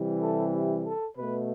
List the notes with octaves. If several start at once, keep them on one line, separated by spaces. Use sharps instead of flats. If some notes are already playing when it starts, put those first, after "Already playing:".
Already playing: C3 E3 G3
A4
G4
A4
B2 A3 B4